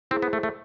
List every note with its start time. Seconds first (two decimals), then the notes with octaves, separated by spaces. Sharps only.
0.11 C4 E4 G#4 C5
0.22 B3
0.33 A3
0.43 A3